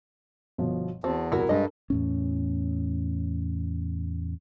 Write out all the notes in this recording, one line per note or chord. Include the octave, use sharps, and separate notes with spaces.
G1 B2 F3
E2 C4 F#4 A5
C2 E4 F#4 A#4
G2 G#3 D4 A4 A#4 D#5
E2 A2 C#4